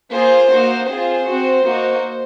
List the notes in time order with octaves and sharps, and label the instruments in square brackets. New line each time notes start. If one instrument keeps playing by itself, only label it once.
[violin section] A#3 F4 G#4 C5
A#3 D#4 F#4
C4 F4 G#4 C5
C4 F#4
A#3 D#4 F#4